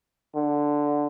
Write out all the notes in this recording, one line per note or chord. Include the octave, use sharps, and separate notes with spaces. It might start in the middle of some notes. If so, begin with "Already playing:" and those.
D3